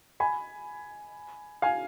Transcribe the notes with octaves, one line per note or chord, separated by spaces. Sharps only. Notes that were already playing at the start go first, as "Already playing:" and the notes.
G#5 B5
F5 G#5